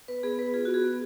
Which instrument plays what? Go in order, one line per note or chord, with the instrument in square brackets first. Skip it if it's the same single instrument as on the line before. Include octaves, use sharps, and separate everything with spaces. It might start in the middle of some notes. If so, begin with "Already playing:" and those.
[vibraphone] B3 B4
B3 G#4
B3 B4
F4 G#4
F#4
B3 G#4
B3